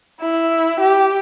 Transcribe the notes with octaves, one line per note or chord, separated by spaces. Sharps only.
E4
G4